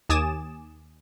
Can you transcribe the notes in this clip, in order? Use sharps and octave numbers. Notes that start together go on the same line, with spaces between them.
D#2 G#5 D6 D#6 A6 E7